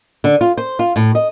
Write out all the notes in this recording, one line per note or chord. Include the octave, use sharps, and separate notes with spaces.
D3
F4
C5
F4
A2
D#5